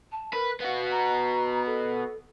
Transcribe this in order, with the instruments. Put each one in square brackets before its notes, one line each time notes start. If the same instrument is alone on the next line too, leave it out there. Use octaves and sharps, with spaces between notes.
[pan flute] A5
[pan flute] A#4 [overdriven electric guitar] B4
[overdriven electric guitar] B3 F#4 [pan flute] F5
[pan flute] A#5
A4